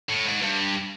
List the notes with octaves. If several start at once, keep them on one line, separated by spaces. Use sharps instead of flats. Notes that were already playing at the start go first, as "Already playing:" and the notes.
A2
G#2
G2